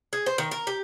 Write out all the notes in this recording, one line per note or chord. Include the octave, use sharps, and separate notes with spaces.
G#4
C5
D#3
A#4
G4